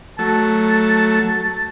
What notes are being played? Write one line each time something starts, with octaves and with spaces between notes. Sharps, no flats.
F#3 A3 A5